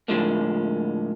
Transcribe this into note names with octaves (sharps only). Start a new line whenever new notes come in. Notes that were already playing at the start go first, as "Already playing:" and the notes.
A2 D3 F3 G#3 A#3